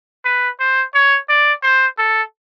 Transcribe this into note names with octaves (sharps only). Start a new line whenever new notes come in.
B4
C5
C#5
D5
C5
A4